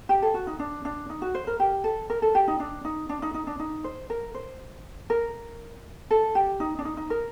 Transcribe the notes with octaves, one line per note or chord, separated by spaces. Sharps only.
G4
A4
F#4
D#4
D4
D4
D#4
F#4
C5
A#4
G4
A4
A#4
A4
G4
D#4
D4
D#4
D4
D#4
D#4
D4
D#4
C5
A#4
C5
A#4
A4
G4
D#4
D4
D#4
D#4
A#4